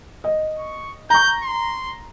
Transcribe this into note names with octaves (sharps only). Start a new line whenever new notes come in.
D#5
C#6
A#5 C#6 G6
C6